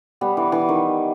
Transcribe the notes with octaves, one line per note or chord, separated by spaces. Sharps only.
G3 B3
E3
E3
D#3